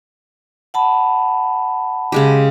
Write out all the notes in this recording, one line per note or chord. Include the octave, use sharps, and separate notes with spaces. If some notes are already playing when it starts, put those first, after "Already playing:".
F#5 A5 B5
C#3 G#3 G4